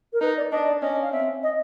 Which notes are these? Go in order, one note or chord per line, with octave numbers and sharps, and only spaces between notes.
A#4
D#4 B4
D5
D4 D#5
D5
C#4 D#5
F5
C4 E5
D#5